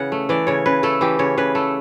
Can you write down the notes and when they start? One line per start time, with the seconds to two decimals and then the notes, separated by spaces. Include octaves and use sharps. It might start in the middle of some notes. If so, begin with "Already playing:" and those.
Already playing: C#3 E3 F#5
0.12 A3
0.29 E3 D5
0.47 C#3 C#5
0.66 C#3 B4
0.83 A3 A4
1.01 E3 G4
1.19 C#3 C#5
1.38 C#3 B4
1.55 A3 A4